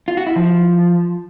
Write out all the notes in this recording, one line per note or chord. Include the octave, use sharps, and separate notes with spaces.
F4
F#4
E4
F3